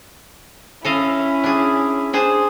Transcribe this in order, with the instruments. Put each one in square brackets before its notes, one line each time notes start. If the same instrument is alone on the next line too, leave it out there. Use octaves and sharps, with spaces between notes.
[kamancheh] C#4 E4 [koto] A4 D#5 F5
[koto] D4 G#4
D4 G#4 C5